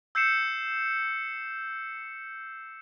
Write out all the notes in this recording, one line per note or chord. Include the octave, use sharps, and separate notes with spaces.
E6 G6 C7 C#7 E7